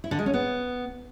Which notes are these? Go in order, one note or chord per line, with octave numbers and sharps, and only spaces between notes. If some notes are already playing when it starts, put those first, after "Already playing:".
E4
D3
G#3
C#4
B3